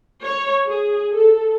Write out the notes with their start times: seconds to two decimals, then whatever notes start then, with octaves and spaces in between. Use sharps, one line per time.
0.23 C#5
0.68 G#4
1.15 A4